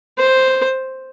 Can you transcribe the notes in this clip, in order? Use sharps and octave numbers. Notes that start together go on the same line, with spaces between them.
C5